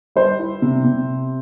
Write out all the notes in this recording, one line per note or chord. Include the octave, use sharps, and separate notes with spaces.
G3 C5
E4
C3
C3